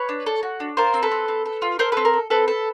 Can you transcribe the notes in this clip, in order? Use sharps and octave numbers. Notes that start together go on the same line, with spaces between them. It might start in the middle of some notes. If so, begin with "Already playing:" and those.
Already playing: B4 C#5
D4
A4
F#4
D4
F4 A#4 C5
C4
A4 B4
C4
C4
A4
F4
A4 A#4 C5
C4 A4 B4
A#4
A4
C4 A4 B4
A4